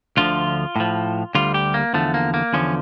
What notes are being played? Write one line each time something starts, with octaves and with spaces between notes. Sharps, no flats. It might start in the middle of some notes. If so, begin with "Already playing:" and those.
D2 D3 F3 F4
A2 F3
D2 D3 G3 F4
G4
A#3
E2 D3 F3 A3
A#3
A#3
E2 D3 F3 C#4